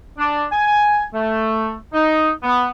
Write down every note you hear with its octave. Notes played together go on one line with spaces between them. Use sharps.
D4
G#5
A3
D#4
B3